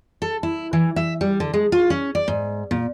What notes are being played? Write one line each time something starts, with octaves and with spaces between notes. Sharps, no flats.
A4
E4
E3
E5
G3
D3
G#3
F4
C#4
D5
G#2
A#2